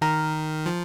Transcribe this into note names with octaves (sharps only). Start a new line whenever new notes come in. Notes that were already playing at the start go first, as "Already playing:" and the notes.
D#3 A#4
F3